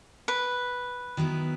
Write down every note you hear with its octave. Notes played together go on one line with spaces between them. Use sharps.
B4
D#3 F#3 B3 E4